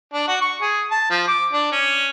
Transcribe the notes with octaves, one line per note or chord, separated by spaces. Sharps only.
D4
F#4
C#6
G#4
A5
F3
D6
D4
C#4